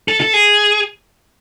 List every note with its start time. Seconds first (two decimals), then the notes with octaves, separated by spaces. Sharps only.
0.08 A4
0.20 A4
0.33 G#4